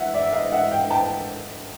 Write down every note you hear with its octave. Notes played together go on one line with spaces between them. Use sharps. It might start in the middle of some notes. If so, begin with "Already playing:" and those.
Already playing: E5 F#5
D5 E5
E5
D#5 F5
E5 F#5
F5 G5
G5 A5